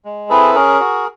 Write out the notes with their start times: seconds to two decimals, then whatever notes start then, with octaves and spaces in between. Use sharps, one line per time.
0.05 G#3
0.30 C4 E4 G#4 A4 B4
0.55 C#4 G#4 A#4
0.80 F#4